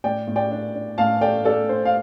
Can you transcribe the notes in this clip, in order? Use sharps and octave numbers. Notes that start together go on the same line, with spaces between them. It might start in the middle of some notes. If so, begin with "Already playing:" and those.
A2 D5 G5
A2
D5 G5
D4
D4
A2 F5 A5
A3 D5 G5
A3 A4 D5
D4 C5
F5